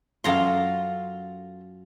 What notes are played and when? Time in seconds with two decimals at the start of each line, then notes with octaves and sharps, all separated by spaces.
0.24 F#2 F4 A4 F5 A#5 C6